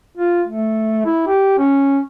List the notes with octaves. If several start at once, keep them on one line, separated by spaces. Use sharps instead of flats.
F4
A3
E4
G4
C#4